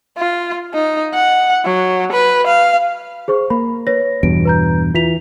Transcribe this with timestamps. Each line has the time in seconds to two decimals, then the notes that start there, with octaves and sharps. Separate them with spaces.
0.18 F4
0.74 D#4
1.14 F#5
1.65 F#3
2.12 B4
2.47 F5
3.28 G#4 C5 C#6
3.50 A#3 B5
3.87 B4 C#5 A#6
4.23 E2 G2 B2 D7
4.45 B4 A#5 G6
4.95 E3 F4 B6 F7